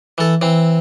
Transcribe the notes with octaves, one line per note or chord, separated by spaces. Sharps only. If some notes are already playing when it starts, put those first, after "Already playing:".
E3 A4
E3 C4